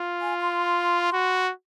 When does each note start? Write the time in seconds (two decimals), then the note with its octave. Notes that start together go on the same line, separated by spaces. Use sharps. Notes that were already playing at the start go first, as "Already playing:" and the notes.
Already playing: F4
0.21 G#5
0.40 C6
1.13 F#4